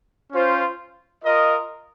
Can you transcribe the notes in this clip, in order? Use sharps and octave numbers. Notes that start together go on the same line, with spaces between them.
C#4 F4 C5
F4 A#4 D#5